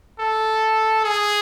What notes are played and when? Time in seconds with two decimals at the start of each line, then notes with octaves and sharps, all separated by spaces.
0.20 A4
1.05 G#4